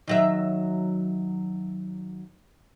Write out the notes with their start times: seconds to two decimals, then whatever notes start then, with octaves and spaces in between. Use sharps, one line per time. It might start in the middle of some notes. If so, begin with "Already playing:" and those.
0.07 D#3 F#3 E5